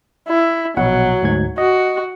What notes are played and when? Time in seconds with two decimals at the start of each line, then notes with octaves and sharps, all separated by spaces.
0.28 E4
0.77 A#1 B2 F#3 F#5
1.23 D2 G#2 G#6
1.58 F#4 D#5